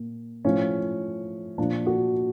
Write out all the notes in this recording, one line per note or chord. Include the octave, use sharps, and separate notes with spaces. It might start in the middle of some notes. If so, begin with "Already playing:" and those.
Already playing: A#2
A2 F3 C#4
A#2 F3 D4
F#4